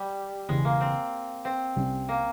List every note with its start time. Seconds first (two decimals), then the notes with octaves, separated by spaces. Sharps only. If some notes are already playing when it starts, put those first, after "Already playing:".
Already playing: G3
0.48 E1 E2 C#3 E3 G#3
0.65 A#3
0.81 C4
1.45 C4
1.76 C2 C3 G3 C#4
2.09 A#3